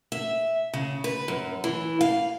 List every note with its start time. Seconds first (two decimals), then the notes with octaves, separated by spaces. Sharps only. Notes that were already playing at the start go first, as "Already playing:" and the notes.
0.12 E5
0.74 C#3
1.04 B4
1.28 F#2
1.64 E3
2.01 F5